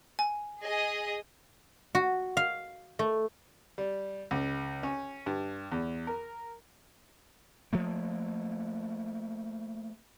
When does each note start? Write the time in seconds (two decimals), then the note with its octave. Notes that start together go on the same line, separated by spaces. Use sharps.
0.19 G#5
0.61 G#4 D#5 D#6
1.95 F#4
2.37 F5
2.99 A3
3.78 G3
4.31 C#2
4.83 C#4
5.26 G2
5.72 E2
6.07 A#4
7.73 F3 A3 A#3